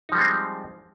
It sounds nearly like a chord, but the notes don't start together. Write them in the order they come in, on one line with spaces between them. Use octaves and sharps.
D#4 F3 G3 G#3 C4